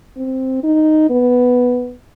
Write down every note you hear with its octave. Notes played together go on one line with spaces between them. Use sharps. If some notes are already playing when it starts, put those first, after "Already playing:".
C4
D#4
B3